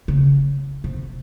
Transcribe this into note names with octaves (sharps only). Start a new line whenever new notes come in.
C#3
C3